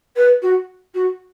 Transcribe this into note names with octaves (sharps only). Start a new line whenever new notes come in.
B4
F#4
F#4